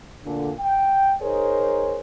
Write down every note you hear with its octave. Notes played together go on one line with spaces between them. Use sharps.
D2 A#2 D3
G5
D#4 G#4 A#4 C5 C#5